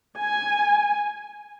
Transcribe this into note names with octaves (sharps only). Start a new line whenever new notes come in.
G#5